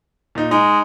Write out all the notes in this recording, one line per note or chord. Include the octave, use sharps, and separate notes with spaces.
A#2 D#4
G#3 D#4